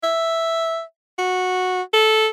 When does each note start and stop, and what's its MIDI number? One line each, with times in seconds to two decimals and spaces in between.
0.03 0.81 76
1.19 1.82 66
1.93 2.28 69